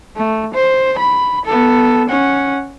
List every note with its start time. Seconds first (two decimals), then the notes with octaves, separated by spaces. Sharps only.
0.16 A3
0.54 C5
0.99 B5
1.45 B3 A4
2.09 C#4 F#5